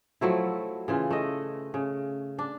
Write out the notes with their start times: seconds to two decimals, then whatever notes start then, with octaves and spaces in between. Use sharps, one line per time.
0.21 F3 F#3 A3 E4
0.88 C#3 E3 F4
1.10 A3 D#5
1.74 C#3
2.39 D4